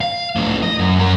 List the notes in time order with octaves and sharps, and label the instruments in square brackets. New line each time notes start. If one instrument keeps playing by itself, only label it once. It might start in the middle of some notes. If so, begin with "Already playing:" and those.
[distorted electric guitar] F5
A2 F3
D#5
F#2
F#2 A#4